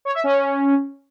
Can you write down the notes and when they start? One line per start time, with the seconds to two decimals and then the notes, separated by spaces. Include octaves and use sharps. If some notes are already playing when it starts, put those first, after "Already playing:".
0.05 C#5
0.14 E5
0.24 C#4